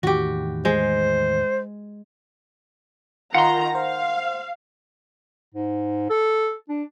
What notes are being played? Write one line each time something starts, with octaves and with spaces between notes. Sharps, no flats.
E2 A2 D#3 F#4 G4
G#3 C5
D#3 F4 F#5 A#5 C6
C5 F5
G#2
A4
D4